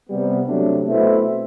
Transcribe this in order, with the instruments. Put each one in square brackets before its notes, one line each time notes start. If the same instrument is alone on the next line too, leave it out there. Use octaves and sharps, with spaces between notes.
[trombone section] C3 G3 B3
C3 F#3 A3 D4
B2 A3 C4 E4